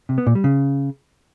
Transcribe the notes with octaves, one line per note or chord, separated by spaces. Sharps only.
C3
B3
A#2
G3
C#3